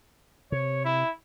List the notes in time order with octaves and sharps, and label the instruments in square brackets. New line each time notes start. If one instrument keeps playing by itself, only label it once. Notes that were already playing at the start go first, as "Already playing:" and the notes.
[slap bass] C3 [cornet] C#5
[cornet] E4